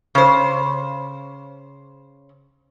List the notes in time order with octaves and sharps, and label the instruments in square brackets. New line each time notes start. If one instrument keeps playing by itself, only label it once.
[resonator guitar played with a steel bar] C#3 C5